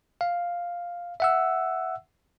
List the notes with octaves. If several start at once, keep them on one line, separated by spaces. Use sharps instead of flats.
F5
E5 F#5 E6